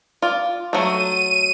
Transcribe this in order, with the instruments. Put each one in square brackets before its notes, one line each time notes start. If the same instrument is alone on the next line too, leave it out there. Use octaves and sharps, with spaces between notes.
[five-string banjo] F4 D5
[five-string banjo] F#3 A3 [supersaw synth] D#7